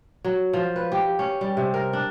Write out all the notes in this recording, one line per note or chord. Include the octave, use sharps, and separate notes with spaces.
F#3
F3
B4
G4
C#4
G3
C3
A#4
D4